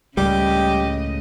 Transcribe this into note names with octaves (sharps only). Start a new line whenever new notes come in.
C#2 A2 C#3 G3 G4 D#5